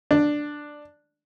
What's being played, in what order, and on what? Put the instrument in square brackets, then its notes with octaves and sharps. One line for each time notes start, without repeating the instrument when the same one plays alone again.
[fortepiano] D4